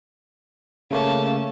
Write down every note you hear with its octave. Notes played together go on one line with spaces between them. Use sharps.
C#3 A3 A#3 C#4 A5